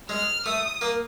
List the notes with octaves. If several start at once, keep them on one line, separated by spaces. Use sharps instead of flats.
G#3 F6
A3 D#6
A#3